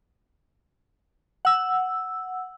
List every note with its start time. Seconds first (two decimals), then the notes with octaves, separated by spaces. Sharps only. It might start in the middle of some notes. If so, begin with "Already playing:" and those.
1.45 F#5 E6